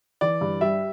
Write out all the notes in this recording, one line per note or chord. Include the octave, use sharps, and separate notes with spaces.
E3 D5
G2
G3 E5